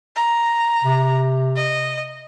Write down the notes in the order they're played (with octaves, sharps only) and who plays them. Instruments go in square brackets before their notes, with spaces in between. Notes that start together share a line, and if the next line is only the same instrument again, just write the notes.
[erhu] A#5
[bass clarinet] C3
[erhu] D#5